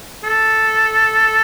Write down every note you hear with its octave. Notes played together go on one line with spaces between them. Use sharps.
A4